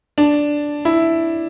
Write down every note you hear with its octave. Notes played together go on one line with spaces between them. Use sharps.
D4
E4